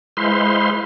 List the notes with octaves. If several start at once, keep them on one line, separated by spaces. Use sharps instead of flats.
G#3 E4 B4 C5 F5 C6